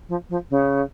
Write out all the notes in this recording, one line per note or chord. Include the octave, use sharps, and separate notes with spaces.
F3
F3
C#3